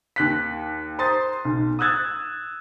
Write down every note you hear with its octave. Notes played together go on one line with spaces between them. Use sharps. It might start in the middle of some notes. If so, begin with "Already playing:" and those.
D#2 F#6 B6
C5 A#5 C6 D#6 A6
B1
D#6 E6 F#6 G#6 A6